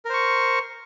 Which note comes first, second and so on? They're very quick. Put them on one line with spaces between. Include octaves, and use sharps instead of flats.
A#4 C5 C#6